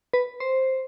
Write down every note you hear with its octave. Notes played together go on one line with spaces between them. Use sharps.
B4
C5